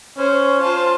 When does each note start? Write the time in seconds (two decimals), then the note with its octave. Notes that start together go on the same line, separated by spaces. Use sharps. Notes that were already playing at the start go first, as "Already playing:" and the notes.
0.17 C#4 C5
0.61 F4 C5 A5